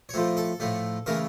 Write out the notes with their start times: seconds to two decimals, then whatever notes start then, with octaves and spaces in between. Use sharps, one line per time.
0.09 C#5
0.14 A2 F3 A3 C5
0.37 A4
0.60 A2 F3 A3
1.06 C#3 E3 A3 A#4